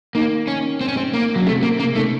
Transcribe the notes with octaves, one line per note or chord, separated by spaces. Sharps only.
D#3 A#3
C#4
C4
C#4
C4
A#3
F#3
C#3
C3 A3
C3 A#3
C#3 A#3
D#3 A3